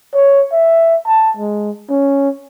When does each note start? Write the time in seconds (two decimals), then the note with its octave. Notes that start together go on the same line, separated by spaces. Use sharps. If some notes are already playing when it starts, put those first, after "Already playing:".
0.14 C#5
0.52 E5
1.07 A5
1.37 G#3
1.90 C#4